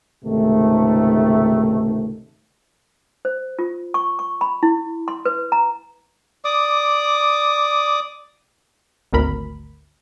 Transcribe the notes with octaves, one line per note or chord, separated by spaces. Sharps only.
C#2 G#2 C3 D#3 A3
C5
F4
C#6
C#6
B5
E4
C6
B4
A#5
D5 D6 D#6
G#1 D2 A#4 B5